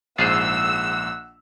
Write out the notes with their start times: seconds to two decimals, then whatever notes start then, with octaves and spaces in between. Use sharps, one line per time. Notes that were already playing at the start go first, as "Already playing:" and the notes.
0.18 A#1 G#2 F4 G#4 C5 F#5 E6